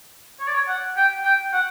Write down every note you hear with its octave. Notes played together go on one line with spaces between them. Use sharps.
C#5
D5
C#5
F#5
G5
G5
F#5